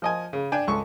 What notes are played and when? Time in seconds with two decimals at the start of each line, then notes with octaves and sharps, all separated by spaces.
0.02 F3 D#5 G#5
0.33 C#3
0.52 D4 G5 G#5
0.67 C#2 A4 C#6